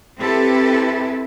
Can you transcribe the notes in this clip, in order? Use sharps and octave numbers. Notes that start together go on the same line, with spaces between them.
C4 E4 G4 A4 B4